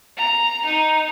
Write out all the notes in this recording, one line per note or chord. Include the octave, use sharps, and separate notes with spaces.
A#5
D#4